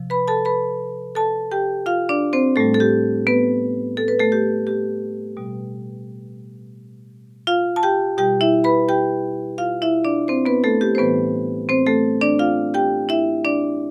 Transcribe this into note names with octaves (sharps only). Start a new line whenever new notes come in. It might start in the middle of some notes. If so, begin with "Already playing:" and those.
Already playing: C3 F3
B4 B5
A4 A5
B4 B5
A4 A5
G4 G5
F4 F5
D4 D5
C4 C5
A2 G3 A3 A4
A4
G4
B3 B4
A4
B4
A3 A4
G4
G4
B2 G3
F4 F5
A5
G4 G5
B2 G3 G4 G5
E4 E5
B4 B5
G4 G5
F4 F5
E4 E5
D4 D5
C4 C5
B3 B4
A3 A4
G4
C5
A2 E3 G3 B3 B4
C4 C5
A3 A4
D4 D5
F4 F5
G4 G5
E4 E5
D4 D5